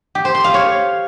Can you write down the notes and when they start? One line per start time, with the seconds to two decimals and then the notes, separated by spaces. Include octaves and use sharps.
0.15 G4
0.25 C5
0.35 C6
0.44 F5
0.54 C#5